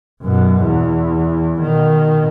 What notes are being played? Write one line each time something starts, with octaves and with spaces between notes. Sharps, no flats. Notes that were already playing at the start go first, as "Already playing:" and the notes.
F#2 B2
E2
B2 D#3